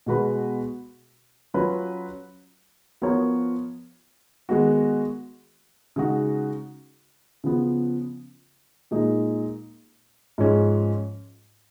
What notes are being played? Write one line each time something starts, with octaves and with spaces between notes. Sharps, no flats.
B2 G#3 B3 F#4 B4
F#3 C#4 F4 B4
F3 B3 F4 A#4 C#5
D#3 G#3 B3 F#4
C#3 G#3 D#4 F#4
C#3 F3 B3
A#2 G#3 D#4
G#2 F3 G#3 C#4